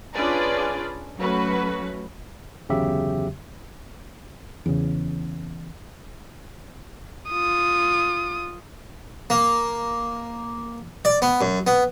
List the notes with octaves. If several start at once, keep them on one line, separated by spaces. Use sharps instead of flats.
C#4 D4 F4 G#4 B4 D5
F#3 A3 C#4 F#4 B4
G1 E2 C#3 F#3 G4 E5
E2 C#3
F4 D#6
A#3
D5
B3
F#2
B3